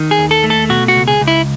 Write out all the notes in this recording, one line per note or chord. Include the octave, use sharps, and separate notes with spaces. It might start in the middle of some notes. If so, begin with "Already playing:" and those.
Already playing: D#3
G#4
D#2
A4
A3
A4
B2 F#4
F#4
C#2
G#4
C#2
E4